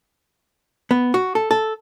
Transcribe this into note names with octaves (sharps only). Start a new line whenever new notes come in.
B3
F#4
A4
A4